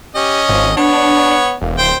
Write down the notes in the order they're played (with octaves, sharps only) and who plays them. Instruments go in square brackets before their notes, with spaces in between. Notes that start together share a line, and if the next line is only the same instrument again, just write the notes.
[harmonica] C#4 D#5 [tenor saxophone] G4
[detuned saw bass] G#1 [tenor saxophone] F3
[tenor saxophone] B3 [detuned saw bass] D4 [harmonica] C#5
[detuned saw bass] E1 [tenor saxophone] A#3
[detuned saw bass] D1 [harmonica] C5 G5